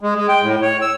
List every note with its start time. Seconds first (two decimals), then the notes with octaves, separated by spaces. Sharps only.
0.01 G#3
0.16 G#3
0.29 G5
0.42 A2
0.62 C#5
0.82 E6